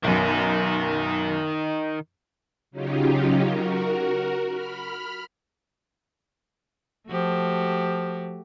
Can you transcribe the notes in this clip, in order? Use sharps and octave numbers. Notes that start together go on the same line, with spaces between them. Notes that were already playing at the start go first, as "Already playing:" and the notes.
B1 F#2 D#3 D#4
C#3 F#3 C#4 D#4 F4 G4
F#4 A#4
B5 F6
F3 A3 F#4 G4